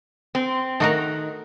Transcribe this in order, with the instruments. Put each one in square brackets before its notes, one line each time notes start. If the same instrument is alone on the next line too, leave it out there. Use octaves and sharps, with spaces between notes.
[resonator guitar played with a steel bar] C4
[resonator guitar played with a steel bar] D#3 [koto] A3 F#4 A#4